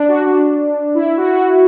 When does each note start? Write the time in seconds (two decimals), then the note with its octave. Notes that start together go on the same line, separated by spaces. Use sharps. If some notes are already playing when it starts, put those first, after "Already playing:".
Already playing: D4
0.08 F#4
0.27 D4
0.95 E4
1.17 F#4
1.25 E4
1.33 F#4